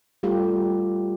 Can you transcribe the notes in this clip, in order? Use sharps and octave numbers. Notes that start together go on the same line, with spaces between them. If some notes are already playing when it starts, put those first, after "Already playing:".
G3 A3 F4 G4